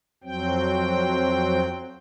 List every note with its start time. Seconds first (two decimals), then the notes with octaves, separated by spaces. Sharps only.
0.24 F2 F#3 C4 G5